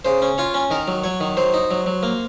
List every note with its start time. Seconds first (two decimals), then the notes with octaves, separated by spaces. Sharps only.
0.05 C#3 C5
0.22 C#4
0.38 F4 C#5
0.54 C#4
0.71 D#3 A#4
0.88 F#3
1.04 F#3 C#5
1.21 D#3
1.37 F#3 C5
1.54 D#4
1.71 F#3
1.86 F#3
2.03 A#3